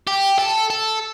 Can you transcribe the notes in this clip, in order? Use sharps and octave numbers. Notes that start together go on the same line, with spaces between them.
G4
A4
A4